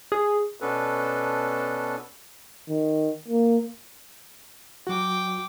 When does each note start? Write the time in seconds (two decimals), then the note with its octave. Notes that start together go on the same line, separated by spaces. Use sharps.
0.12 G#4
0.60 B2 B3 C#4 D4 A4 B4
2.69 D#3
3.28 A#3
4.87 F#3 F#4 G5 D6